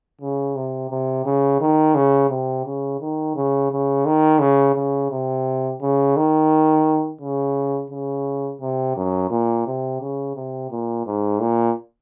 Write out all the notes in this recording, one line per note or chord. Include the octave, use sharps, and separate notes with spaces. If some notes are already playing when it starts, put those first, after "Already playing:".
C#3
C3
C3
C#3
D#3
C#3
C3
C#3
D#3
C#3
C#3
D#3
C#3
C#3
C3
C#3
D#3
C#3
C#3
C3
F#2
A#2
C3
C#3
C3
A#2
G#2
A#2